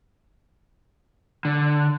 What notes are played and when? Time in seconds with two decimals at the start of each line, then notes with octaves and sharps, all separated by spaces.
1.45 D3